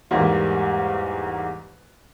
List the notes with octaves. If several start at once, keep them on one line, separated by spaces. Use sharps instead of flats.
E2 G#2 G3 A#3